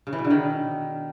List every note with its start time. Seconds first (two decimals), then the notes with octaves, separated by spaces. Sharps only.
0.07 C#3
0.13 E3
0.19 B2
0.25 D3
0.30 D#3